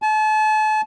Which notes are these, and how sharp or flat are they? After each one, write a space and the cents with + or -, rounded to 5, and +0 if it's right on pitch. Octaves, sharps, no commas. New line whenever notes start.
A5 -40